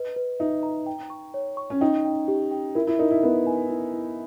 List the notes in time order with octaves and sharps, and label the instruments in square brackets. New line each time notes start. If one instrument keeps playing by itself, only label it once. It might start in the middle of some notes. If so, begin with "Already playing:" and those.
Already playing: [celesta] B4 D#5
B4
[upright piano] D#4 [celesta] E5
[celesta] A#5
G5
C#6
C#5
C#6
[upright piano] C#4
[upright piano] D#4 [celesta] G5
[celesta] G5
G4
G5
[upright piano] E4 [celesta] A#4
[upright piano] E4
[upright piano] D#4 [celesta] A#4
[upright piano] E4
[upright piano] B3 [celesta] A#4
[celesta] G#5
E4
E4